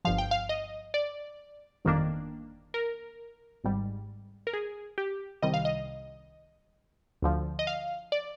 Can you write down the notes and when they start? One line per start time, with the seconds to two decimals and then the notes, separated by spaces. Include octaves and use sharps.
0.05 G1 G2 F3 F5
0.18 G5
0.31 F5
0.49 D#5
0.94 D5
1.85 G1 F2 D#3 A#3 D4
2.74 A#4
3.64 G#1 G#2 G3
4.47 A#4
4.53 G#4
4.98 G4
5.42 C2 C3 D#3 G3 D#5
5.54 F5
5.65 D#5
7.22 D2 D3 F3
7.59 D#5
7.67 F5
8.12 D5